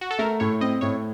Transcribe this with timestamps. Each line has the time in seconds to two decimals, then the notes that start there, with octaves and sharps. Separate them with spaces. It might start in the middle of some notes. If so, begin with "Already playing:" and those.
0.01 F#4
0.11 A4
0.19 A3 A#4
0.40 A2 C#5
0.61 C4 D#5
0.81 A2 C#5